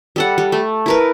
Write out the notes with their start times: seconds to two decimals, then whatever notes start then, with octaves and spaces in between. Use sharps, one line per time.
0.16 G3 A4 F#5
0.38 G3
0.52 A3
0.86 E4 A#4 B4